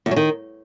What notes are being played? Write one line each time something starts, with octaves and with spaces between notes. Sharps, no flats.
E2
F#3
D#3